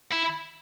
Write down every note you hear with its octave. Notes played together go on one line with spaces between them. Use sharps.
E4